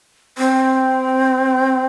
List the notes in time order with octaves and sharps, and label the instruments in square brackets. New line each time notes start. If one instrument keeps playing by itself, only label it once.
[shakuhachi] C4